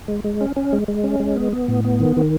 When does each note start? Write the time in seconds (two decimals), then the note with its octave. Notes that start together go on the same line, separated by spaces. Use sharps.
0.08 G#3
0.24 G#3
0.41 C#4
0.56 C#4
0.73 G#3
0.88 G#3
1.04 C#4
1.20 G#3
1.36 B3
1.53 B3
1.68 A2
1.84 B3
2.00 D#3
2.17 D#3